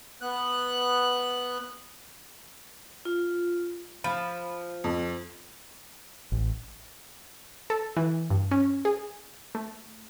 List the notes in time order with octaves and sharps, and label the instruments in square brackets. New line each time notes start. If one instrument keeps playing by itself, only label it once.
[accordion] B3 F#6
[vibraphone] F4
[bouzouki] F3 [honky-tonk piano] B5
[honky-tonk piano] F2
[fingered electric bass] A1
[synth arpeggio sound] A4
E3
G2
C#4
G#4
A3